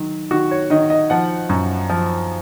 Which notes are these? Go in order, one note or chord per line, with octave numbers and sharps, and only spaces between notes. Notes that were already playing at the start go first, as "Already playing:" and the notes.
Already playing: D#3 F#3
D#3 F#4
C#5
D#3 D#5
D#5
F3 F#5
F#2
F3